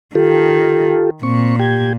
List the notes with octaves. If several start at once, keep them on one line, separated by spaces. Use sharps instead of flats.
D#3 F4 G4 A4
A#2 C4 C#6
G4 G5 G#6